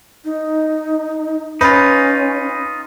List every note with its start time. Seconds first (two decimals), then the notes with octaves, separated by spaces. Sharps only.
0.25 D#4
1.61 C#4 D#4 F4 B4